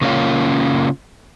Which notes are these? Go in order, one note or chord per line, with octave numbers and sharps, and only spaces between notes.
C#3 A#3 C#4 F4